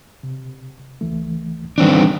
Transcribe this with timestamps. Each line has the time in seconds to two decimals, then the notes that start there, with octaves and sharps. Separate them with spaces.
0.23 C3
1.01 C#2 E3 A3
1.78 D#3 E3 G3 C4 D4 B4